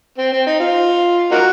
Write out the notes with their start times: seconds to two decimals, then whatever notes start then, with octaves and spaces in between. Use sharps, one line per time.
0.18 C4
0.32 C4
0.47 D#4
0.60 F4
1.31 A#3 D#4 F#4